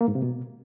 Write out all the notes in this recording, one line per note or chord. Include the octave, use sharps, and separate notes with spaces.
A#3
G#2
C3
B2